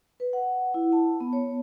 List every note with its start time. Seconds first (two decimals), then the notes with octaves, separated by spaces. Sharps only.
0.20 B4
0.33 F#5
0.74 E4
0.93 A5
1.20 B3
1.33 C#5